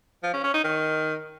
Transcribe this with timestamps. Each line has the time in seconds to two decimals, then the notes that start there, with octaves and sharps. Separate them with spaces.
0.23 F3
0.34 C#4
0.44 C#4
0.54 D#4
0.64 D#3